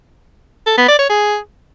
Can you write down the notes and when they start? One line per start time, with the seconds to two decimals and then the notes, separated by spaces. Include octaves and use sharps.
0.66 A4
0.77 B3
0.88 D5
0.99 C#5
1.09 G#4